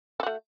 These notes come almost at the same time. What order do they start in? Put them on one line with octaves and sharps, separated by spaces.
A4 F#4 A3